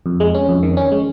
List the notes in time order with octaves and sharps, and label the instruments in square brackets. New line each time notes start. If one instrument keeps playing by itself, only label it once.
[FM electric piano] F2
G#3
C#4
F2
D#3
C#4
G#3